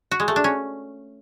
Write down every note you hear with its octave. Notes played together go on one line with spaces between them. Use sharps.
F#4
G#3
A3
D4
C#4